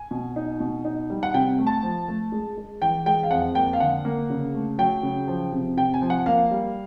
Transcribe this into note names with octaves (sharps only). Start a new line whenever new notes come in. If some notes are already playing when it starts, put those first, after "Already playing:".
Already playing: G#5
B2
D#4
B2
D#4
G3
F#5
C3 G5
A3
A5
F3
A3
G#3
G#3
E3 G5
G#3 G5
F5
F2 F#5
A#3 G5
F5
D3 F#5
A#3
C#3
A3
F#3 G5
C#3
F3
C3
C3 G5
G#5
F3
F#5
A#3 F5
G3